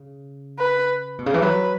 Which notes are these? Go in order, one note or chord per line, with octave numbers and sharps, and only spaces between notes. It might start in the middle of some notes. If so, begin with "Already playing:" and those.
Already playing: C#3
B4
B2
C#3
E3
F#3 B4